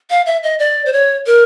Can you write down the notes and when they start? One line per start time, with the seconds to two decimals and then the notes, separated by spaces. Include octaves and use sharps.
0.10 F5
0.26 E5
0.43 D#5
0.59 D5
0.86 C5
0.93 C#5
1.26 A#4